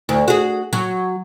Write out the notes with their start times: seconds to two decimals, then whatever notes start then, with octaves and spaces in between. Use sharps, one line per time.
0.09 D2
0.28 F#4 G#4
0.73 F#3